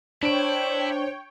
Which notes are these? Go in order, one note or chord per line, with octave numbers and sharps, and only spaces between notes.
D4 E4 C5 C#5 G5 D7